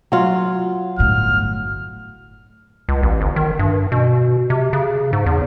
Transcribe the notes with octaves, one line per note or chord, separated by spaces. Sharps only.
F#3 F4
G1 A2 F6
C#2
A1
G1
D#3
G2
B2
C3
C#3
G#2
E2